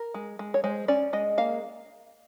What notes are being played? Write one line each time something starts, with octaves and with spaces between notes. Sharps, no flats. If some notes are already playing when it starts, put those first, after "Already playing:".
Already playing: A#4
G#3
G#3
C#5
G#3 C5
C#4 D5
G#3 D#5
A#3 F5